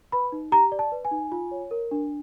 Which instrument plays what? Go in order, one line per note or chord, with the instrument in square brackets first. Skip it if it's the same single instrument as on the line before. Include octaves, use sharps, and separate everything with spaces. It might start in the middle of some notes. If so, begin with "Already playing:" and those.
[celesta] B4 B5
D#4
G4 A#5
D5
A5
B4
G#5
D#4
F4
C#5
A#4
D4